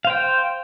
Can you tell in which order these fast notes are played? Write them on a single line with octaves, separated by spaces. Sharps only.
F5 C5 G5